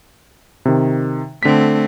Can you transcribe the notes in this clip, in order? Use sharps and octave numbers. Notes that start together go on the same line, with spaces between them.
C3 D#3
D3 A3 C4 B6